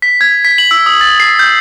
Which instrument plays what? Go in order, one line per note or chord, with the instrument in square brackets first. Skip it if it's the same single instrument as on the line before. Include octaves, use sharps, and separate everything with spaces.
[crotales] B6
G#6
B6
F#7
E6
D#6
A6
C7
G6